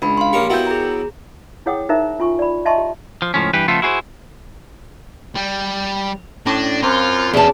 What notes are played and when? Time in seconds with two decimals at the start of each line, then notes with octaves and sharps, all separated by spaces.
0.02 C#2 D4 B5
0.17 F5 C6
0.33 A#1 A#3 G4 C#5
0.50 F#3 B3 E4 A#4 G5 G6
0.67 G#4 A#5
1.66 E4 G#4 C#5 F#5 G5 D#6
1.89 D#4 A#4 C5 E5 A#5
2.19 C#4 F4 G#5 C#6
2.39 D5 B5
2.65 D#5 E5 A5 A#5 C6 C#6
2.78 G4
3.22 F3
3.34 C#2 A2 F3 C#4
3.53 G2 E3 G4 B4
3.68 C#3 F3 A3 B3 F4 A4
3.82 E4 F#4 G#4 A#4 C5
5.36 G3
6.46 A2 C#4 D4 A#6
6.83 F#2 C4 F4 C5
7.34 E2 B2 C#4 G#4 A5